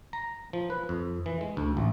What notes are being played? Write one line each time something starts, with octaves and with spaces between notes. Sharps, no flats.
A#5
F3
B4
F2
E3
G#3
D2
A1